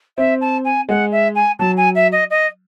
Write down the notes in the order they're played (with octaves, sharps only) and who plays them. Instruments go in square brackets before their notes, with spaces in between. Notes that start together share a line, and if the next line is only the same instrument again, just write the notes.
[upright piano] C4 [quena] E5
[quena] A5
G#5
[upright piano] G#3 [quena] F#5
[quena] E5
G#5
[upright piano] F#3 [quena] A5
[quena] G#5
E5
D#5
D#5